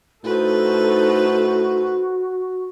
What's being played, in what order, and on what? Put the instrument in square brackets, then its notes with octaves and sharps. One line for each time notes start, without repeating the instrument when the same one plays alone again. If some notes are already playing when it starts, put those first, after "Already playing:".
[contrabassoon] A2 [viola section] D#4 A4 [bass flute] F#4 [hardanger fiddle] B4 C5